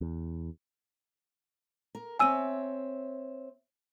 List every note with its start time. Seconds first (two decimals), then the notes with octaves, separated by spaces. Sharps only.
0.01 E2
1.95 A#4
2.19 C4 C#5 E5 G#5 E6 D#7